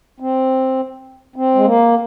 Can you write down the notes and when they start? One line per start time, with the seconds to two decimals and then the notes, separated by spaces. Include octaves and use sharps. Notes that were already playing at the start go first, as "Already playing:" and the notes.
0.20 C4
1.36 C4
1.55 G#3
1.65 A#3